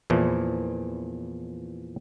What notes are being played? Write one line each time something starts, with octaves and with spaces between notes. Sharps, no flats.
E2 A#2 E3 F3